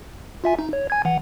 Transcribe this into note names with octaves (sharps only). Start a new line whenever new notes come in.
F4 E5 G#5
D#4
C#5
G#5 G#6
E3 F#5